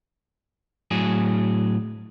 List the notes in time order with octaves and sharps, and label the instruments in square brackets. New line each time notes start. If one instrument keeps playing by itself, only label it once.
[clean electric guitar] A2 F#3 G#4